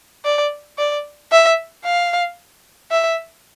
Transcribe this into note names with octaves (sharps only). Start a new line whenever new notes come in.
D5
D5
E5
F5
E5